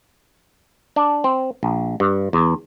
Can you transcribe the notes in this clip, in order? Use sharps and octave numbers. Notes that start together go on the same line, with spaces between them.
D4
C4
A#1
G2
E2